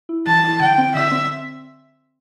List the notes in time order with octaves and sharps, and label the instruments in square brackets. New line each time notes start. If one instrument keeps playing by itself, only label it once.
[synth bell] E4
[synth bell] E3 [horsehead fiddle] A5
[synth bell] E4
[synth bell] D3 [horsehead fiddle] G5
[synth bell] C4
[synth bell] D3 [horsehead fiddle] E5
[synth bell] C4